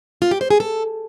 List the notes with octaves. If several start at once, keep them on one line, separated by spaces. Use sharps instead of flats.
F4
G4
C5
G#4
A4